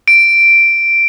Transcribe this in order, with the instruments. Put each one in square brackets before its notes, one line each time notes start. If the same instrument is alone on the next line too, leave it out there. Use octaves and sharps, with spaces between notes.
[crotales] D7